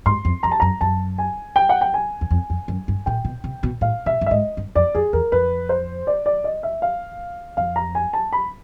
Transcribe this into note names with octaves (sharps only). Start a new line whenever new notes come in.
G#2 C6
F2
F2 A#5
A5
F#2 A#5
F#2 A5
G#5
G5
F#5
G5
G#5
E2
F2
F2
F#2
G2
A#2 G5
B2
C3
B2
A2 F5
B2 E5
G2
E5
G#2 D#5
G2
F2 D5
F2 G#4
E2 A#4
F2 B4
C5
D5
D5
D#5
E5
F5
F2 F5
A#5
G#5
A5
B5